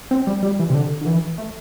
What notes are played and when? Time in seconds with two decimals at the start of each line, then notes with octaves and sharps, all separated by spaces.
0.11 C4
0.27 G3
0.43 G3
0.59 E3
0.69 C3
0.74 D3
1.01 D3
1.06 E3
1.38 A3